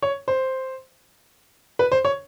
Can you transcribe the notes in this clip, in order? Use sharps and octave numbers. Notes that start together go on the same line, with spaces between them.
C#5
C5
B4
C5
C#5